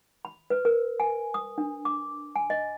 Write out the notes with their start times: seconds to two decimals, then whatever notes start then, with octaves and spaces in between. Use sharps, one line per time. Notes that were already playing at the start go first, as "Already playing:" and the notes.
0.25 B5
0.50 B4
0.65 A#4
1.00 G#5
1.34 D#6
1.58 D4
1.85 D6
2.36 G#5
2.50 D#5